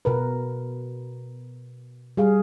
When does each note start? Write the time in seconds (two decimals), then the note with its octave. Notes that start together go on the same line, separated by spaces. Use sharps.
0.05 B2 A#4 B4
2.17 G3 G#4 F5